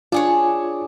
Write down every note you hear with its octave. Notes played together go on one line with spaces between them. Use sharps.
D4 F4 G#4 C#5